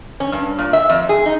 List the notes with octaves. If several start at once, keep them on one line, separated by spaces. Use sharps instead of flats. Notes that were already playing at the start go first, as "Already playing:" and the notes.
C#4
G2
A#2
E5
F2
G#4
D#4